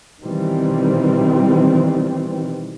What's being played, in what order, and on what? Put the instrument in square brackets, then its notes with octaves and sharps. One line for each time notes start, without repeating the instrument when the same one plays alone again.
[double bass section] B2 D#3 E3 G3 C4